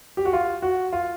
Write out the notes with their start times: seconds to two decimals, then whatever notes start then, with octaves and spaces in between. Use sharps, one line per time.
0.17 G4
0.25 F#4
0.33 F4
0.62 F#4
0.93 F4